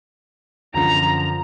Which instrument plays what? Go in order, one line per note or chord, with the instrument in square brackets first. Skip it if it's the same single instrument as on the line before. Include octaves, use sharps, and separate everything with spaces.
[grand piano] F#2 D3 F3 [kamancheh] A#5